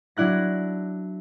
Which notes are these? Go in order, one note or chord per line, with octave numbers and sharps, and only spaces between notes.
F#3 D4 E4 F#6 A#6